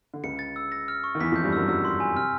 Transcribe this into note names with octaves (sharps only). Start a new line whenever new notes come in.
D3
C#2 C#3 C#7
A6
E6
A#6
F6
C#6
D#3
E2 E3 B6
F2 F3 G6
G2 G3
F#2 F#3 E6
F#2 F#3 E6
C6
G#5
C3 F6